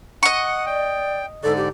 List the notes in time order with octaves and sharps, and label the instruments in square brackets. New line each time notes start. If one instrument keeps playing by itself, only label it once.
[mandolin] D#5 C#6 [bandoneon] F#5
[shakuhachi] D5 [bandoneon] G5
[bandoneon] G#2 D3 D5 [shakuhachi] A4
[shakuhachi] G4